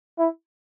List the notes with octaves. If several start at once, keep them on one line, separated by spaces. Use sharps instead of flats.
E4